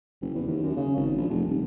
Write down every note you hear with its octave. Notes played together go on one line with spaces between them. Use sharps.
F#1
E2
D#2
F#2
C#3
G#1
A#1
F1
D#1